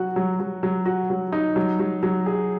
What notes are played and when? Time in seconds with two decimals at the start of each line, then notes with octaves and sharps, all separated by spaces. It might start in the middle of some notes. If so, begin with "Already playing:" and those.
Already playing: F#3 F#4
0.16 F#3
0.40 F#3
0.63 F#3
0.85 F#4
1.10 F#3
1.32 D#4
1.56 F#3
1.79 F#3
2.03 F#3
2.26 G#4